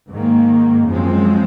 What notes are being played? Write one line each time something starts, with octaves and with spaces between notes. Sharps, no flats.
G#2 D#3 A#3
F#2 F3 G#3 C4